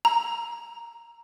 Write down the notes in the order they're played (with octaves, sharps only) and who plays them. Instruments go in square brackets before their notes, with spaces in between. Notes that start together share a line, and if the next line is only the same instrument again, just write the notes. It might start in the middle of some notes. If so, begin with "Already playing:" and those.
[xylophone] A#5